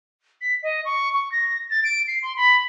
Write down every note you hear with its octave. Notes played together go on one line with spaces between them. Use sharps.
B6
D#5
C#6
C#6
A#6
A6
D7
C7
C6
B5